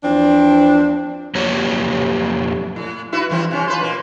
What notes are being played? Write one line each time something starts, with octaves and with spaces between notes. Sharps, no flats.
E2 F3 C4 D4
F2 F#3 A#3 G4 C#5
A2
E4 F#4 B4
G2 E3 C4
C3 C#4
F4 B4 C5
A#2 A#3